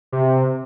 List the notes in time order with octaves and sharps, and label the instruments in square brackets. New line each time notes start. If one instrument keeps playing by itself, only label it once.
[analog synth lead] C3